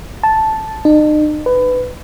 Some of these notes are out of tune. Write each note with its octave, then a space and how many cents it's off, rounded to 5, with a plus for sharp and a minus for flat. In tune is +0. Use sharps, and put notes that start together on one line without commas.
A5 -5
D#4 -40
B4 +20